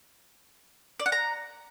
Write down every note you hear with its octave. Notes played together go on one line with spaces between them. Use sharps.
D5
F#5
A#5